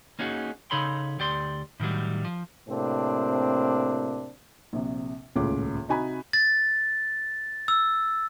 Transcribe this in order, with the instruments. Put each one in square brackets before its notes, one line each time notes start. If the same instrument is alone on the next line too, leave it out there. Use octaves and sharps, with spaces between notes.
[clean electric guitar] A#3 C#4 D#4 F#4 G#4
C#3 D#4 A4 C#5 B5 C6
D2 G4 D5 C6
A2 D#3 F#3 G3
F3
[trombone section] A2 C3 A#3 C4 D4
[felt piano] A#1 C3
D#1 C#2 A2 F4 D6
C3 D#4 F#4 G#5 A#5 B5
[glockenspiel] A6
E6